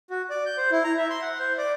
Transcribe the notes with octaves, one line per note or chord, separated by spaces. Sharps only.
F#4
D5
G6
C5
E4
A#5
E5
C6
F#5
C5
D5